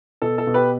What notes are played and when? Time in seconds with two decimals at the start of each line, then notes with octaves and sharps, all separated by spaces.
0.22 B2 A4
0.38 A4
0.47 B2
0.54 G4 B4